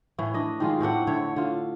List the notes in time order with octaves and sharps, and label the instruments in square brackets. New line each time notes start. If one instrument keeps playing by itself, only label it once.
[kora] A2 E3
D4 D#5
D#3 G#3 F4
A2 C4 D4 F#5
D3 C#5 E5
D3 F4